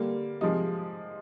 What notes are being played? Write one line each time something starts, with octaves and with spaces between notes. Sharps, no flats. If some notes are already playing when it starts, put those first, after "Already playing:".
Already playing: D3 G3 A#3
C3 F3 G#3 D#4